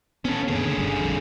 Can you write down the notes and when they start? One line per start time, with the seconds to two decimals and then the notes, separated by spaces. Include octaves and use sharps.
0.25 B3 C#4 A4
0.48 F#2 D3 D#3 A#3 G#4
0.65 C#3
0.78 G1 G3
1.01 A1 F2